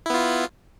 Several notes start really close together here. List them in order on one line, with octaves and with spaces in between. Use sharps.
E4 B3 F4